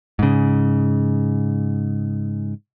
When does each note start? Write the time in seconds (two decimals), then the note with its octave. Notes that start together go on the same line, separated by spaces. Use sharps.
0.19 G#2 C#3